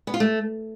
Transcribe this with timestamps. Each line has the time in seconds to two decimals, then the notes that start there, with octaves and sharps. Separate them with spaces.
0.07 B3
0.14 F4
0.20 A3